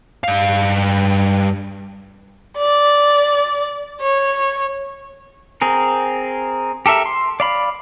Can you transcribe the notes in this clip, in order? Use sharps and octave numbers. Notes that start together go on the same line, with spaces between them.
G2 F5
D5
C#5
C4 G#4 A#4
G4 A4 A#4 E5
C6
D5 F5 B5